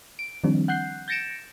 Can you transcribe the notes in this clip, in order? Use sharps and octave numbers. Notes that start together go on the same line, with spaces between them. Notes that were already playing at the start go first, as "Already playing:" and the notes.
D7
D#3 F3 G3 C4 D4
F#5 F#6 G6 C7
G6 A6 A#6 C#7 D7 E7